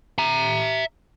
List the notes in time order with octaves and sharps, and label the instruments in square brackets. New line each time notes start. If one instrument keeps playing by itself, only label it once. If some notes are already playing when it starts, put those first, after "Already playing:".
[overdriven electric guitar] E5 A#5